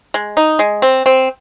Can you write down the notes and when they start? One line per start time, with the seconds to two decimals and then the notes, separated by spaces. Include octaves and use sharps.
0.14 G#3
0.37 D#4
0.59 G#3
0.82 C4
1.06 C4